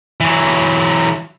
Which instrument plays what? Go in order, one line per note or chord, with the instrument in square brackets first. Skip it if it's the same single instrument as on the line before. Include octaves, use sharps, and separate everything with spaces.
[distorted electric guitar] E3 F#3